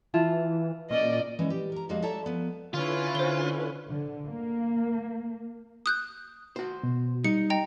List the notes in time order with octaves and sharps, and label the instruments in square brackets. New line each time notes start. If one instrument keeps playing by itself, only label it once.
[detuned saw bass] E3 [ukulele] E4 F4 A5
[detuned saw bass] A#2 [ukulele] C#4 [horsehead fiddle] D5 D#5
[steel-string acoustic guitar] E3 G#3 C#4
G4
A#4 A#5
F2 G3 G#3 A#3 F#4 F5
A4 C#5 D5 E5 A5 A#5
F3 B3
[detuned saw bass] D3 [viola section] C#4 E4 B4 [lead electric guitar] F4
[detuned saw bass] D3 [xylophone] C5 G7
[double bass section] D3
A#3
[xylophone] D#6 F#6 G6
[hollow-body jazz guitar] F#4 C5
[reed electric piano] B2
[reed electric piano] G3 [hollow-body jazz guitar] D#4 [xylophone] C#7
[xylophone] D#5 G5 A#5